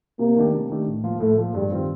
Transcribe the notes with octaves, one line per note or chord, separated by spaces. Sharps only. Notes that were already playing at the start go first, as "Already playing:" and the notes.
C3 A#3
D#3 A3 D4 G4
C3
D#3 A3 D4 G4
A2
F3 A#3 F4
A2 A3
F3 A#3 F4
G2 G3
D#3 G3 C4 F4